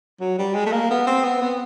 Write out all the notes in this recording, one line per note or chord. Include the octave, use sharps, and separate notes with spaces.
F#3
G3
G#3
A3
A#3
B3
C4
B3
B3